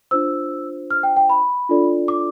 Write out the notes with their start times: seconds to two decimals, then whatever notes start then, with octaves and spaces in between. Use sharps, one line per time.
0.11 D4 F4 C5 E6
0.91 F6
1.03 G5
1.17 G5
1.30 B5
1.69 D4 F4 A4 D5
2.08 D6